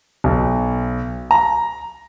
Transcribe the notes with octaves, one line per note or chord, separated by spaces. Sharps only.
B1
A#5